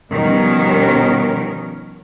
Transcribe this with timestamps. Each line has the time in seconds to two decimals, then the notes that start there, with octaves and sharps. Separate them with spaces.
0.13 B2 D#3 F3 G3 C#4 A#4